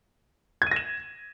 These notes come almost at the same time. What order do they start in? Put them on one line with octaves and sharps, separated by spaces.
G#6 D#7 A#6 E7